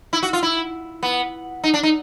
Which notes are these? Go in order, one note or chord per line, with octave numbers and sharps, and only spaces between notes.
E4
F#4
F4
E4
B3
D#4
D4
D#4